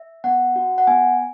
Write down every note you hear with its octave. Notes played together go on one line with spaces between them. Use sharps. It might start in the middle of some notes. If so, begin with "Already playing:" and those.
Already playing: E5
B3 F#5
F#4
F#5
B3 G#5